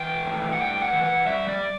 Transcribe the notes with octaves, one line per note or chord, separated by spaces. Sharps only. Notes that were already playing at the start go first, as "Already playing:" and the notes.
Already playing: E3 G5
A2
F#5
G2 G5
F#5
E3
F#5
G3 E5
D5